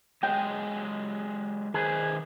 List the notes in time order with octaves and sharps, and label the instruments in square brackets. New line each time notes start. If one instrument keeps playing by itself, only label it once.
[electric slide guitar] F#3 G#3 D#5 [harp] G5
[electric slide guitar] D#3 B4 C5 [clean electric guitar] G#4